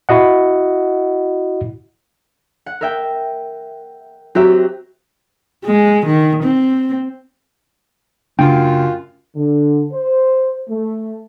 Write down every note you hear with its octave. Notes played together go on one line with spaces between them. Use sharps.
E4 F#4 D#5 F#5
F#5
A#4 E5 G5
F#3 C4 G4 E5
G#3
D#3
C4
F#2 C#3 A3 D4 F4 G5
D3
C5
A3